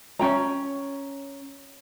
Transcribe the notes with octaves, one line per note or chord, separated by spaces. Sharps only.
C#4 G5 A#5